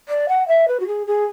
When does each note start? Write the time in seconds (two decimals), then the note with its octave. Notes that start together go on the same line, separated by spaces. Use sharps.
0.08 D5
0.29 F#5
0.48 E5
0.68 B4
0.80 F#4
0.87 G#4
1.07 G#4